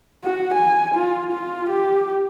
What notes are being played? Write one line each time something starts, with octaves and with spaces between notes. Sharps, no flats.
F#4
G#5
F4
F4
G4